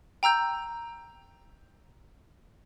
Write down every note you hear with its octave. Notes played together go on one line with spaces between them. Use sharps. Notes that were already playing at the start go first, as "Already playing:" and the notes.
G5 A#5 E6 G6